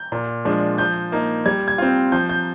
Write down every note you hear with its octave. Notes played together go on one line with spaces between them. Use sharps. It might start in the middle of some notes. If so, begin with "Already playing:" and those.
Already playing: G6
A#2
F3 G#3 D4
F3 G6
A#3 D#4
G3 G#6
G#6
C4 F4
F3 G6
G6